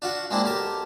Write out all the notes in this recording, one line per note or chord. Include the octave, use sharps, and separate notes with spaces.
D4 F4 F#4
G#3 A#3 C4 D4 E4
B1 G4 A#4 A5